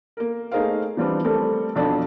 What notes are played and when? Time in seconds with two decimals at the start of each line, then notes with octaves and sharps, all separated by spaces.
0.17 A#3 A#4
0.52 A3 D#4 G#4 A#4 C5 F5
0.97 E3 F3 G3 B3 C4 D4
1.24 G3 A3 C4 A4 A#4
1.75 B1 F2 F3 D4 A4